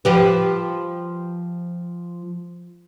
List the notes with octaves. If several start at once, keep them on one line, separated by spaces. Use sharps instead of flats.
F3 G4 B4